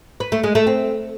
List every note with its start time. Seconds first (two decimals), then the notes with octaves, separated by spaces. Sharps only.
0.20 B4
0.32 A3
0.44 G#3
0.55 A3
0.67 C4